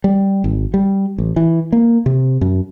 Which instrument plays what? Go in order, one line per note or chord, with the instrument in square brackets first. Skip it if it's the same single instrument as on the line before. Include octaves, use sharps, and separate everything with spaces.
[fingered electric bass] G3
G#1
G3
A1
E3
A#3
C3
F#2